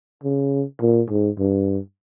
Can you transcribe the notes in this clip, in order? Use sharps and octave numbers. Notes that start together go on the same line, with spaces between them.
C#3
A#2
G#2
G2